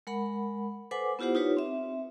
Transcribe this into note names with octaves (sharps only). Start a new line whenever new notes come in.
G#3 A#4 F#5 B5
A4 B4 C5 F#5 G#5 D6
B3 E4 F4 G4 C5 F#5
D#4 F4 G4 B4 C#5
C4 E5